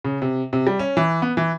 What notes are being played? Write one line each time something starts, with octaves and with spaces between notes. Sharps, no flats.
C#3
C3
C3
G3
C#4
E3
B3
E3